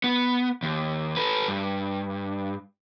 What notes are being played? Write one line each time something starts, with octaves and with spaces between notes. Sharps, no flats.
B3
D#2
A4 B4
G2